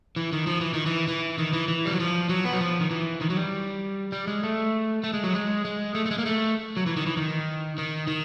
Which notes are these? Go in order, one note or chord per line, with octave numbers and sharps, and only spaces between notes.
E3
D#3
F3
E3
D#3
E3
E3
D#3
E3
E3
G3
F#3
F3
F#3
B3
F#3
F3
D#3
E3
D#3
F#3
G3
G3
G#3
A3
A3
G#3
F#3
G#3
G#3
A3
A3
G#3
A#3
A3
F#3
E3
D#3
E3
D#3
D#3
D#3